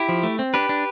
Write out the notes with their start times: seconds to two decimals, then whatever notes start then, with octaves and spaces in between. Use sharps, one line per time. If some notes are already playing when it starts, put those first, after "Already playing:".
Already playing: E4 G4
0.09 F3
0.23 A3
0.39 C4
0.54 D4 G4 B4
0.69 D4